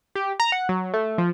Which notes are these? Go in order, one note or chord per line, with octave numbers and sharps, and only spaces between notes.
G4
A#5
F#5
F#3
A3
F3